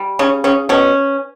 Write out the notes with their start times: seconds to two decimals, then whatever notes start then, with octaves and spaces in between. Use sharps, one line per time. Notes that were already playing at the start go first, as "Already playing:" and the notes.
Already playing: G3
0.19 C#3 C#4
0.44 C#3 C#4
0.69 B2 C#4